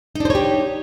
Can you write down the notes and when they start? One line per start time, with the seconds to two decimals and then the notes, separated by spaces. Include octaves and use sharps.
0.15 D#4
0.20 D4
0.25 C5
0.30 C#5
0.35 G4